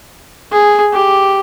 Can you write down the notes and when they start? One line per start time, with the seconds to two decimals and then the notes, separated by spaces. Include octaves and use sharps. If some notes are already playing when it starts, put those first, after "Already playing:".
0.52 G#4
0.93 G4